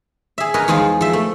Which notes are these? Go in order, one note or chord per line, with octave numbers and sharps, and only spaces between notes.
G#4 E5
A#4 B4 C#5 D#5
E2 F3 G#3 D#4 F4
F3 E5
A3